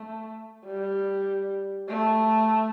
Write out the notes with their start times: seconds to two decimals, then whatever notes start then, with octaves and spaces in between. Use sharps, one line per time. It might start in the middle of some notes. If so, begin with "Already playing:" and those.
Already playing: A3
0.66 G3
1.88 A3